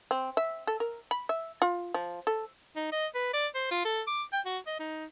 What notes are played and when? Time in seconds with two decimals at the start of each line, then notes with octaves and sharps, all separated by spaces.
0.11 C4
0.37 E5
0.67 A4
0.80 A#4
1.11 B5
1.29 E5
1.62 F4
1.94 F3
2.27 A4
2.76 D#4
2.92 D#5
3.15 B4
3.34 D5
3.55 C5
3.71 F4
3.85 A4
4.07 D6
4.33 G5
4.46 F#4
4.67 D#5
4.80 D#4